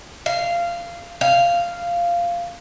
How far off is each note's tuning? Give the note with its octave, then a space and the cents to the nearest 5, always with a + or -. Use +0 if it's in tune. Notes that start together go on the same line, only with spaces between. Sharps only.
F5 -15
F5 -10